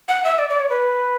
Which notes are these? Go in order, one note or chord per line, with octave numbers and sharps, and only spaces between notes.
F#5
E5
D5
D5
C#5
B4